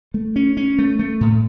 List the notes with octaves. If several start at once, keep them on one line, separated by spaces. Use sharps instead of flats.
A3
C#4
C#4
A3
A3
A2